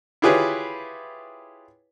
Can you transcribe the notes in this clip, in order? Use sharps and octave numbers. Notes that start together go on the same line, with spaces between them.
E4 F4 G4 G#4 B4 C#5